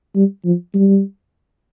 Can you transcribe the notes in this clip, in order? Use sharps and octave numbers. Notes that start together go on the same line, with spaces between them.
G3
F3
G3